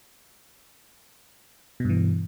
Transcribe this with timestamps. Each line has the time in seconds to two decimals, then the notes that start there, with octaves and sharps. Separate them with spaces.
1.80 B2
1.85 G2
1.90 E3